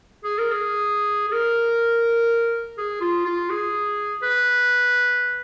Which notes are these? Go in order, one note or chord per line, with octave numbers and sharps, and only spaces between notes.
G#4
A#4
G#4
G#4
A#4
G#4
F4
F4
G#4
B4